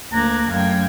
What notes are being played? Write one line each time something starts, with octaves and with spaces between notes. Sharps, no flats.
D2 A#3 A#5 D6 F#6 G#6
F#2 A3 F5 G5 G#6